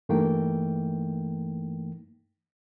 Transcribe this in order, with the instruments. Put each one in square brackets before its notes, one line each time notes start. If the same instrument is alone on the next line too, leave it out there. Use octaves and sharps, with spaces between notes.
[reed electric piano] G2 E3 A3 A#3 D#4 G5